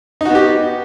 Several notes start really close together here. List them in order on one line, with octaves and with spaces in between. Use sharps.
D#4 F#4 B3 G4